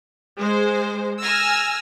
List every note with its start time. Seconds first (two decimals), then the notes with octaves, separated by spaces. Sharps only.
0.37 G#3 C5
1.21 G#5 E6 F6 A#6